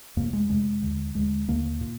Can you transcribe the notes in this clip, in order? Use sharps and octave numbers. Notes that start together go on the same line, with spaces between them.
F2 C3 A#3
G#3
F2 C3 G#3
D#2 D3
D#2 D3 G#3
D#2 D3 A#3
A#2